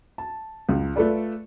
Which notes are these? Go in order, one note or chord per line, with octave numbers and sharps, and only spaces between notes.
A5
C#2
A3 F4 A4 B4 D5